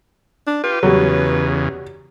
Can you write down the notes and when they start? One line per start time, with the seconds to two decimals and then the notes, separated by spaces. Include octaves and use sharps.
0.47 D4
0.64 F4 G4 B4
0.83 E2 C#3 F#3 G3